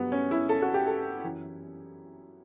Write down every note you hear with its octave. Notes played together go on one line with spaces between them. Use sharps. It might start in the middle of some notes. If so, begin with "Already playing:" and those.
Already playing: G2 F#3 B3
C#4
E4
A4
F#4
G4
A4
F#2 E3